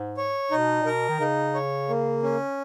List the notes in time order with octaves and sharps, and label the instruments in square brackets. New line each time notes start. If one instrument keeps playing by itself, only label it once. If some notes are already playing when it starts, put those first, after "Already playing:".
Already playing: [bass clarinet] G#2
[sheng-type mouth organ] C#5
[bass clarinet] B2 [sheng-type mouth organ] D#4
[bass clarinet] A#2
[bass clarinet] B2 [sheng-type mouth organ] A#4
[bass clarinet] D#3
[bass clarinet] C#3 [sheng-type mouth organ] D#4
[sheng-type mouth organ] C#5
A#3
C#4